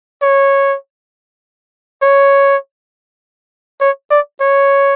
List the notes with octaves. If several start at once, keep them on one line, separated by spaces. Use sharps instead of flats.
C#5
C#5
C#5
D5
C#5